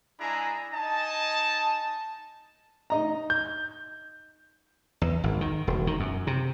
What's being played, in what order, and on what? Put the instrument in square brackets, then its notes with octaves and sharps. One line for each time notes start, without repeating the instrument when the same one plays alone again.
[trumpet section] G#3 D4 E4 G#4 G#5 A#5
D#4 D#5 G#5 A5
[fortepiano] D#4 D#5 A#5
[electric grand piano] G6
[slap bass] E2
G#1
D#3
E1
D#3
F#2
C3